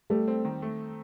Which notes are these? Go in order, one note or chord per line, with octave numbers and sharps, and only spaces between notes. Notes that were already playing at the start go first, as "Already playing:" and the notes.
G3 A3
C4
D#3
A3